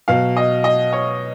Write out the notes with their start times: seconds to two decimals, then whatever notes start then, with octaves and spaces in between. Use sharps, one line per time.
0.08 B2 F#3 F5
0.37 D#5
0.64 D#5
0.93 C#5